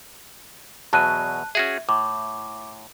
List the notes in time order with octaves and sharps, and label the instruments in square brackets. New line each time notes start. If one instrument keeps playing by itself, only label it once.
[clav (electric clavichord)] E2 B2 F#3 [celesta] A5 F#6 D#7
[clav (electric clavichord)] C#4 F#4 G#4 [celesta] E5
[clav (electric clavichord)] A2 [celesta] D6